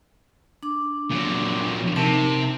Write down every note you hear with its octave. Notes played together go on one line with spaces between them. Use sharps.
D4 D6
A#2 F#3
C3 D#4 A#4 A5